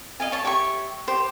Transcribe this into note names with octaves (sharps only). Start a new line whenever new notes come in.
D#5 F5 G#5
C#5 A5
G4 C#5 E5 C#6
G4 C5